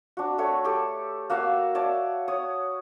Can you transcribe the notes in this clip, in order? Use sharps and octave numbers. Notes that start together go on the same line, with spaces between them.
D4 F#4
A3 F#4 C#5
G4 A4
A#3 F#4 E5 F5
C#5 D5 A5
C#5 D#6